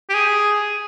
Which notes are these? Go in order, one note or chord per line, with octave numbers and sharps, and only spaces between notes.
G4
G#4